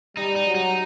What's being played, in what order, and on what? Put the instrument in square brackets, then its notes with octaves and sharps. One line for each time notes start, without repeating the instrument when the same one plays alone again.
[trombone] G3 [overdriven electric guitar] D#4
[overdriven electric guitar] D#4
[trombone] F#3
[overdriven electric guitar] D#4